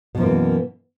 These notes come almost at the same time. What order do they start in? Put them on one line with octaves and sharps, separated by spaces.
B2 F#2 F3 A#3 E3